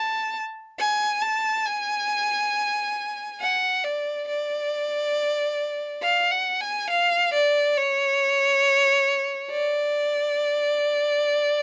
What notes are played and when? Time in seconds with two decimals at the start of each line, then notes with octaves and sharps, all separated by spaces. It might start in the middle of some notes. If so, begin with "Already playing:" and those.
Already playing: A5
0.79 G#5
1.22 A5
1.66 G#5
3.41 F#5
3.84 D5
4.28 D5
6.02 F5
6.32 F#5
6.61 G#5
6.90 F5
7.34 D5
7.77 C#5
9.51 D5